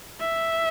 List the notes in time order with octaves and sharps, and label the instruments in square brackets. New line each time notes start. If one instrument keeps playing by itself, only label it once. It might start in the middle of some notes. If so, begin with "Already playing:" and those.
[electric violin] E5